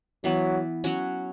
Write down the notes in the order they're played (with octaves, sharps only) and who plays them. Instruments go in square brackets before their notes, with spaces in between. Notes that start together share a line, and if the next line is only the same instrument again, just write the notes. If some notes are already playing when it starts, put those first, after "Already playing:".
[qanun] E3 B3 E4 [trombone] F#3
[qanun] F#3 C#4 F#4